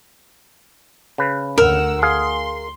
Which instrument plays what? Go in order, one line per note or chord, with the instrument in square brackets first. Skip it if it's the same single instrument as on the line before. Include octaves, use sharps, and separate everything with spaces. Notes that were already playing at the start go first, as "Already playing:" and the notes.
[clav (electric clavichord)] C#3 B4
[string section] D2 F#5 E6 [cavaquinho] A#4
[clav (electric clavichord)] G#4 F5 [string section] C6